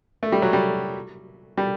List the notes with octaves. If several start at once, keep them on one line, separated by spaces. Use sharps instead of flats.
A3
G3
F#3
G3
G3